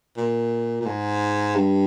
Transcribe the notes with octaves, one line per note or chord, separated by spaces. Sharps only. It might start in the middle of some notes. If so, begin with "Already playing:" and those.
A#2
A#2
G#2
G2